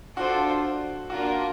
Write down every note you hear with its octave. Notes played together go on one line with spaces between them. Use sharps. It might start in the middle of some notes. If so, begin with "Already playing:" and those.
D4 F4 F#4 A4 C5
A#3 D4 F4 F#4 A#4